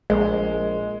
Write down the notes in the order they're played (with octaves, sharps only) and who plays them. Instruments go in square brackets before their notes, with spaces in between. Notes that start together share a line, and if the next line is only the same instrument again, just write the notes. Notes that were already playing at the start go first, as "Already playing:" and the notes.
[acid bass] A#1 [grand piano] G#3